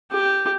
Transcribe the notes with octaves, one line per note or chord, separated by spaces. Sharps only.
G4